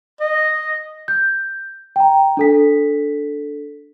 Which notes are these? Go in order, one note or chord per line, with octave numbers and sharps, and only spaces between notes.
D#5
G6
G5 A#5
D4 A4 B6